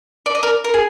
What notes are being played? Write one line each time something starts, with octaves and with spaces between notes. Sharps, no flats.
D5
D#5
A#4 D5
A#4
G#4